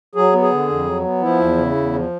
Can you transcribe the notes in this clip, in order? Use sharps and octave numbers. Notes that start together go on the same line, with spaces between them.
F#3 G#4
B3
G#4
D3
F2
F#3
B3
F3 E4
E2
C#3
E2
F3